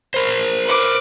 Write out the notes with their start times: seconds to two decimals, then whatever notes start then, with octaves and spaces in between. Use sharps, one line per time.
0.14 A#4 C5
0.64 B4 D6